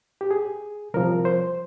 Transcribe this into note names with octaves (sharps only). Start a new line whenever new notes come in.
G4
G#4
C2 C3 F3 A#4
C5